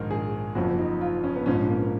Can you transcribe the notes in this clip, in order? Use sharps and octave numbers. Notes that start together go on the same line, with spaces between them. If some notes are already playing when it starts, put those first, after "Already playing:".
Already playing: A#1 G#2 D#3 A#4
G#4
F#1 F2 F3 F#4
D#4
F4
C#4
B3
A#1 G#2 F3 C#4
A#3